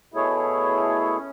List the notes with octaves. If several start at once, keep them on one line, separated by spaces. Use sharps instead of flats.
B2 A3 E4 G#4 C#5
C#4